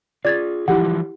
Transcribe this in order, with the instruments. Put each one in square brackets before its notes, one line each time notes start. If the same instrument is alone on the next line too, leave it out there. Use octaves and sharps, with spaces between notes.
[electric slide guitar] F4 G#4 [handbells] D5 G#6 A6
[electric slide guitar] E3 F3 G3 [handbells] E4 G4 F#5